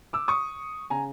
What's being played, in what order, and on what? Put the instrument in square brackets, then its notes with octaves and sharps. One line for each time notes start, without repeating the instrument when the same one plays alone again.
[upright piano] D6 E6
C#6 D#6
C#3 G#5 A#5